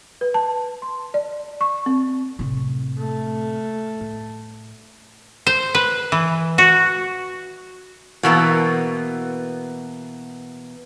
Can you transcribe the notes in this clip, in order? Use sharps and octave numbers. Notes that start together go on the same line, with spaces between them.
B4
A5
C6
D5
C#6
C4
A2 C3
A3
A2
C5
B4
E3
F#4
B2 E3 A#3 B3